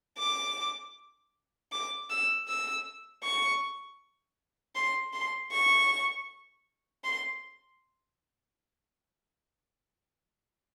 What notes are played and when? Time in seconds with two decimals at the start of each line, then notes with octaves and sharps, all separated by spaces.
0.19 D6
1.72 D6
2.10 E6
2.48 E6
3.23 C#6
4.75 C6
5.13 C6
5.52 C#6
7.04 C6